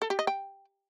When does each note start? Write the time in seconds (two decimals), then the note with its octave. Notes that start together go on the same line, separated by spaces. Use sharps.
0.02 A4
0.10 G4
0.19 D#5
0.27 G5